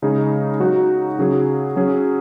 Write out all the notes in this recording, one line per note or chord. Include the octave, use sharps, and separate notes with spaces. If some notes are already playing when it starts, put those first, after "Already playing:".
C#3 G#3 D#4 G#4
F#3 D#4 F#4
C#3 F#3 C#4 G#4
F#3 C#4 G#4